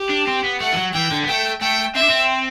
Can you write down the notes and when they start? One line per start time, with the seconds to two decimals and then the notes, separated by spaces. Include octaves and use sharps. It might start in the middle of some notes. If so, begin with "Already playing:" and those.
Already playing: G4
0.09 D4
0.27 C4
0.44 B3
0.60 A3 F#5
0.73 E3
0.77 F#3
0.94 E3 G5
1.11 D3
1.23 B3
1.28 A3 G5
1.61 A3 G5
1.95 C4 E5
2.02 D4
2.10 C4